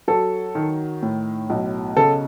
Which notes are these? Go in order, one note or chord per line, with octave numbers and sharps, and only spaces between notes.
F#3 A4
D#3
A2
B1
C#3 A4